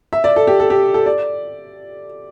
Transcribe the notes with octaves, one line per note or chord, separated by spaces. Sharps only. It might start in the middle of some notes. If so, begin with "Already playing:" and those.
E5
D5
A4
G4
A4
G4
A4
D5